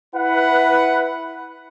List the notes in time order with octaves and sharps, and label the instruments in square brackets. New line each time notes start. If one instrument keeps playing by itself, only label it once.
[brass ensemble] E4 B4 F#5